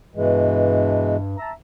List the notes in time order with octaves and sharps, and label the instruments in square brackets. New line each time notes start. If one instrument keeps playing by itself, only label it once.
[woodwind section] G2 [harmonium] B2 E3 G#3
[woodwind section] E5 A5 A#5